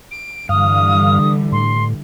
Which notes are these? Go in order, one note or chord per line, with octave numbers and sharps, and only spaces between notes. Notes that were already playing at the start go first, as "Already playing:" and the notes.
D7
G2 D3 E3 G3 F5 D#6
A2 C6